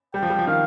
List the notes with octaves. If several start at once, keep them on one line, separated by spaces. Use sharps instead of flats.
G3 G5
F3
G3
F3
D#3 F5